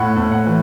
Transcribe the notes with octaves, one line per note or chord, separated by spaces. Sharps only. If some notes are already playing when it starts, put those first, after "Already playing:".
Already playing: A2 F#5
A2
F#5
E3